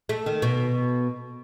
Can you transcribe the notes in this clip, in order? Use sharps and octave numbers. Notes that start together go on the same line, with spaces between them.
A3
D#3
B2